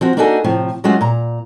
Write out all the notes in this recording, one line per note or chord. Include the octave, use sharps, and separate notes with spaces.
F3 C4 F#4
A#3 D4 D#4 F#4 A4 G#5
A2 C3 F3
F#3 G#3 A3 C#4 F4 F#4
A#2 A#5